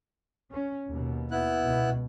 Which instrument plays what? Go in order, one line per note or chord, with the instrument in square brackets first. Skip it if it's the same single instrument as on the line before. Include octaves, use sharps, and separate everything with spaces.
[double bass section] C#4
D#2 B2
[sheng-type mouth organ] B3 E4 F#6
[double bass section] C#2 B2